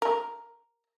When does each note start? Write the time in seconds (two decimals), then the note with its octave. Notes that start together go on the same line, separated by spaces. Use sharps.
0.02 A#4